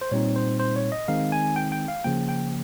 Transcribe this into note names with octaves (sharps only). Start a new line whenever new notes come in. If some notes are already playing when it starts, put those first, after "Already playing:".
C5
A#2 G3 C4 D#4 C#5
C5
C5
C#5
D#5
D#3 G#3 C4 D#4 F5
G#5
G5
G5
F5
C#3 F3 A#3 G5
G5